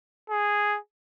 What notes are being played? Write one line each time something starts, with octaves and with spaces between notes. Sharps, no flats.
G#4